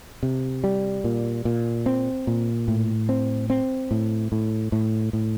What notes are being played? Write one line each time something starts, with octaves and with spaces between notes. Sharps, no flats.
C3
G3
A#2
A#2
C4
A#2
A2
C4
C4
A2
A2
A2
A2